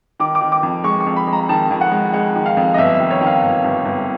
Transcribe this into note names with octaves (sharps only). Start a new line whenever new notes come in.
D#3 D6
D6
D#3
D6
F2
G#3 C#6
C#6
F2
B5
G#3
A#5
D#3 A5
F2
F#5
G#3
G#3 F#5
D#3
F5
F2
D#5
G1 E5
E5
D#3
C#5
D#3
F5
G1
G1
G1